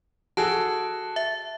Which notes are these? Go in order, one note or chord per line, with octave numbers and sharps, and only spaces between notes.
F#4 G#4 A4 A5
E5